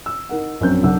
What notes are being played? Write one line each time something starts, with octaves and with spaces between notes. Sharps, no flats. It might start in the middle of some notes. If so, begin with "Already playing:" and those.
E6
D#4 A#4 F#5
A#1 F#2 F#3 C4 C5 G6
B1 D4 A#4 F#5 E6